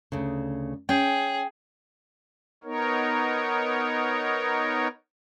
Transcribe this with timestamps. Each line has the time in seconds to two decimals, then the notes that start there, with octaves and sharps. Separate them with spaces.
0.12 D2 C#3
0.89 C#4 G#4 G5
2.64 B3 D#4 A#4 C#5